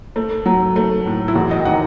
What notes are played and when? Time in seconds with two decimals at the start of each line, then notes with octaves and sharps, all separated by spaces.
0.16 A3
0.46 F#3
0.76 A3
1.06 A2
1.28 E4
1.35 E2 F#4
1.51 D#5
1.59 G5
1.65 D#3 F#5